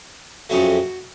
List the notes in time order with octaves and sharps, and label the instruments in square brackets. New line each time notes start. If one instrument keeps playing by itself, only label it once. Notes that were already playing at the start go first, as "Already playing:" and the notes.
[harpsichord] F2 C#3 F#3 A3 F#4